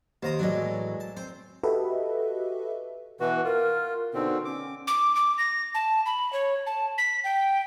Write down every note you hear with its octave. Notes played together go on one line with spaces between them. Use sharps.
D#2 C5 A#5 D#6
A2 E3 F#3 G#3 D4
A5
C4 C5
F#4 G4 A4 B4 D#5 E5
B2 E3 F#4 B4
F4 A#4
B2 D3 C4 D#4
C#4 D6
D6
D6
A#6
A5
B5
C#5
A5
B6
G5